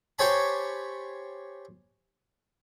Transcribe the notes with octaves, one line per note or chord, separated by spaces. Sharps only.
G4 C5 C#5 G#5 A5 B5